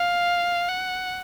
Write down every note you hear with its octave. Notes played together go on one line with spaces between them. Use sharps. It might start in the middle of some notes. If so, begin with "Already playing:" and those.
Already playing: F5
F#5